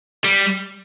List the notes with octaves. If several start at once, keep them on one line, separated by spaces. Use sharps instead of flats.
G3